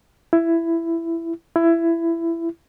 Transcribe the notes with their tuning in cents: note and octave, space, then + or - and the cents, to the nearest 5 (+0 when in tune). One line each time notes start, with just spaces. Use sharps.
E4 +15
E4 +20